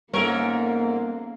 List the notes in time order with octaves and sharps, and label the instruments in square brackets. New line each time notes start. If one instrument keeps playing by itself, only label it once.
[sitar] G#2 A#4 [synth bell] G3 B3 [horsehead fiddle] A#3 [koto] C#4 A4 E5